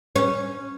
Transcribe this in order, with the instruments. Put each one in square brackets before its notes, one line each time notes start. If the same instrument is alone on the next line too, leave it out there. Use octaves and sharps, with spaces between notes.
[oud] C#4